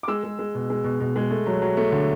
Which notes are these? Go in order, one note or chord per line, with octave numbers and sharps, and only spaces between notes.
D6
G#3 E6
G#3
G#3
B2
G#3
B2
B2
G#3
A3
F#3
F#3
A3
D3